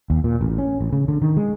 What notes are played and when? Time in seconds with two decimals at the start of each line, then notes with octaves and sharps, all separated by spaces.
0.10 D#2
0.24 A#2
0.41 A1
0.58 C#4
0.81 A1
0.93 C#3
1.08 D3
1.22 D#3
1.37 G#3